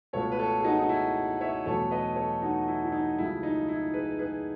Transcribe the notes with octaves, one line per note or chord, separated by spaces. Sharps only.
C#2 B2 A3 A4 C#5
B4
A4 C#5
G#4
D#4 F#4
D#4
E4
C#5 E5
E2 B2 F#3 A3 A4 C#5
B4 D#5
A4 C#5
D#4 F#4
E4
E4
D#4
C#2 C#3 F#3 A3 E4
D#4
E4
G#4 B4
G#4 B4